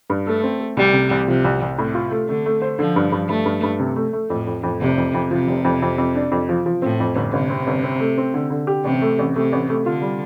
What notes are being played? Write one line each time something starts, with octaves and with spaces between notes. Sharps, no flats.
G2
A3 A4
C4
A4
C2 G3
C3
C2
C3 F3
C2
C2
A2 C3
F4
A3
D3 A3
A3
C5
D3 F3
G2
G2
G2 A3
G2
G2
C3
A3
A3
F2 A2
F2
F2
F1 C3
F2
F2
C3 F3
F1
F2
F2
F2
D4
F2
F3
F3
A2 C4
F2
G1
G1 C3
C4
G1
C4
A3
C4
D3
D3
G4
A1 C3
A3
A1
C3 A3
A1
A3
D3 F4
G3